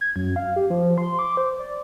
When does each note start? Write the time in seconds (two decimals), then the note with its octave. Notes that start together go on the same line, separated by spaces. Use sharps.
0.01 G#6
0.16 F#2
0.36 F5
0.56 G4
0.70 F3
0.98 C6
1.19 D6
1.37 C5
1.59 D5